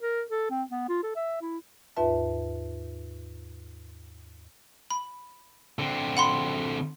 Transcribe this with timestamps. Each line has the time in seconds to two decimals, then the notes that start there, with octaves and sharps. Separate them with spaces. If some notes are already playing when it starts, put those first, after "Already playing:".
0.01 A#4
0.31 A4
0.50 C4
0.70 B3
0.89 F4
1.03 A4
1.16 E5
1.42 E4
1.96 D#2 G#2 F4 B4 E5 A5
4.91 B5
5.79 D3 C4
6.17 F#5 B5 C6